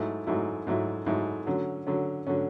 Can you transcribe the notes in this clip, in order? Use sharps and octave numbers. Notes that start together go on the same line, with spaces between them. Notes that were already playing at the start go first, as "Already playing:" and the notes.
Already playing: G#2 F#3 A3 E4
G#2 F#3 A3 E4
G#2 F#3 A3 E4
G#2 F#3 A3 E4
D3 F#3 C#4
D3 F#3 C#4
D3 F#3 C#4